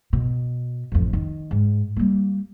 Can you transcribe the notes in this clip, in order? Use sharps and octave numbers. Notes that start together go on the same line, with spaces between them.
B2
A1 F2
D#3
G#2
G3 A#3